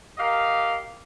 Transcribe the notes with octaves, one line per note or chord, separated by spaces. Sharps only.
G4 A#4 D#5 F5